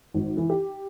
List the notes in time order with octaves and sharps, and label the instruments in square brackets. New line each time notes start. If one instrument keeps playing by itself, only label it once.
[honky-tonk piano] G#1
E3
G4